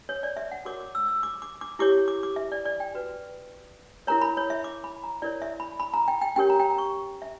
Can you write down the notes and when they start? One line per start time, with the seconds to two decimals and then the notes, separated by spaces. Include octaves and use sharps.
0.09 C#5
0.23 D5
0.37 E5
0.52 F#5
0.65 F#4 A#4 C#5 D6
0.80 D6
0.95 E6
1.08 E6
1.23 D6
1.42 D6
1.61 D6
1.79 E4 G4 C#5 D6
2.08 D6
2.23 D6
2.36 E5
2.52 D5
2.65 D5
2.80 G5
2.94 F#4 B4
4.07 E4 A#4 C#5 A#5
4.22 B5
4.37 C#5
4.50 E5
4.64 D6
4.84 B5
5.04 A#5
5.22 E4 A#4 C#5 D5
5.42 E5
5.60 B5
5.80 B5
5.94 A#5
6.08 G5
6.22 G5
6.36 C#4 G4 A#4 C#5 G5
6.50 A#5
6.60 G5
6.65 A#5
6.78 C#6
7.22 E5